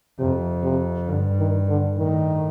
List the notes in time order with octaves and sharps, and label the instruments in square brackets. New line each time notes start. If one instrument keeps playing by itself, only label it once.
[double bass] F2 [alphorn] C3
[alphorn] C3
[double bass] G2 [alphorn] D3
[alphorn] D#3
D3
[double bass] A2 [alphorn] D#3